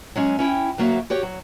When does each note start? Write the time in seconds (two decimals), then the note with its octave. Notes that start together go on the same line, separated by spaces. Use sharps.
0.16 F#3 G#3 C#4
0.39 C#4 E4 G5
0.78 D2 F#3 A#3 F#4 E5
1.10 F#4 G4 C#5
1.23 F#3